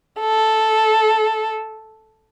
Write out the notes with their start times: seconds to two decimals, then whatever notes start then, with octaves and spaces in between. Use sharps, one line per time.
0.20 A4